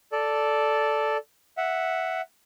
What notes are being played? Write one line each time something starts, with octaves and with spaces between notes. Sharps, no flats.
A4 D5
E5 F#5